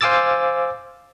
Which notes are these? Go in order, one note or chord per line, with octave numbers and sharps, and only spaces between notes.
C5 F5 G#5 D6 E6 A6